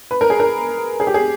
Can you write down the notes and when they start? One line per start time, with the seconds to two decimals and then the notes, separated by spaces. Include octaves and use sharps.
0.11 B4
0.21 A#4
0.30 G#4
0.40 A#4
1.00 G#4
1.07 G4
1.14 G#4